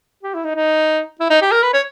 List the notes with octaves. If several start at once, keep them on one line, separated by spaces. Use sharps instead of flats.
G4
E4
D#4
D#4
E4
D#4
G4
A#4
B4
C#5